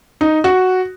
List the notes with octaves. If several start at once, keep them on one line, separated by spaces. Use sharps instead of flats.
D#4
F#4